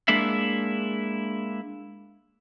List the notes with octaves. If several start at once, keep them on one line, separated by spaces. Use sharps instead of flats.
G#3 A#3 D4 E4 E5